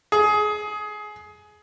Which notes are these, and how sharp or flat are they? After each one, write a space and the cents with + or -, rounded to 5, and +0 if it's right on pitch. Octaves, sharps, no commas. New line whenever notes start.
G#4 +20